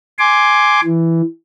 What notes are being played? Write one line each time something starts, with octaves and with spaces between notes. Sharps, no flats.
G#5 C6 D6
E3